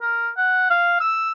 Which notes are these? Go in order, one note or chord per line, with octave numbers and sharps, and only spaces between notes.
A#4
F#5
F5
E6